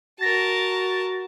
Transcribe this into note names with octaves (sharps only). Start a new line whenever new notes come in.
F#4 A#4 A5 A6 A#6